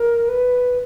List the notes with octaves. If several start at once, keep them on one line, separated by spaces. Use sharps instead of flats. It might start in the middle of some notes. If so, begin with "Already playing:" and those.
Already playing: A#4
B4